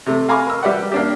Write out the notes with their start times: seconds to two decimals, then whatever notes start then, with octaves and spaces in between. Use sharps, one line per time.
0.06 C3 A3
0.29 F5 G#5 A#5 B5 C#6 D6
0.47 A#4 E6
0.63 G3 G4 B4 D5 E5 F#5
0.92 A#3 D4 G4